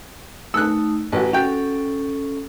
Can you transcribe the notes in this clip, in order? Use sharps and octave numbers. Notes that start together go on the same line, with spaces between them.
A3 D#4 E6 F#6
A1 F#4 B4
C#4 F#4 A4 G5